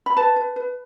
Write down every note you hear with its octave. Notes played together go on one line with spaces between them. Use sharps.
B5
B4 A5
B4
B4